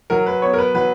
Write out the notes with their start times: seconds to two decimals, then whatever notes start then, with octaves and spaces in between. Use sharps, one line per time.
0.10 F#3 A#4
0.26 B4
0.42 B3 C#5
0.53 A#4
0.58 B4
0.75 F#3 B4